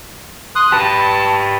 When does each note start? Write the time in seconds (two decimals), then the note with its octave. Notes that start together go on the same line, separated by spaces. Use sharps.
0.56 C6 D#6 F#6
0.72 G4 B4 A5